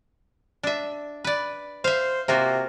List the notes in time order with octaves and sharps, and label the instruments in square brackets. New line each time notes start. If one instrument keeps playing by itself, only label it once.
[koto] D4 E5
B4 D5
[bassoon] C5 [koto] E5 F5
[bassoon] C3 [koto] A#3 F4 F#4